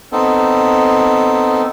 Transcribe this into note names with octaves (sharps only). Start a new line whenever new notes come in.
B3 C4 D#4 A4